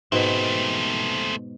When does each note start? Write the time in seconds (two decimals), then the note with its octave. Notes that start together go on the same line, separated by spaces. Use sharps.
0.12 G#2 B2 A3 C4